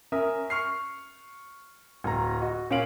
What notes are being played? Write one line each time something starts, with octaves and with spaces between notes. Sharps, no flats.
C#4 A#4 E5 D#6
C#6 F6 C7
D1 A#5
F#4 D#5
A#2 C#4 C#5 F5 D7 F#7